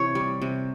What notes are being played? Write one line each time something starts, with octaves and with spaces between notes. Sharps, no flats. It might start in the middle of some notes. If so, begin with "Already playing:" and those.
Already playing: C3 E3 C#5
G3
C3